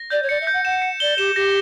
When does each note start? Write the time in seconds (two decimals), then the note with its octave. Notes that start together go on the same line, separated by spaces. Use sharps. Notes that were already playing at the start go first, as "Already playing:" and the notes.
Already playing: A#6
0.10 D5 G6
0.22 C#5
0.29 D5 C#7
0.41 E5
0.47 G6
0.53 F#5
0.64 F#5 E7
0.82 C#7
1.00 D5 G7
1.18 G4 E7
1.35 G4 A#6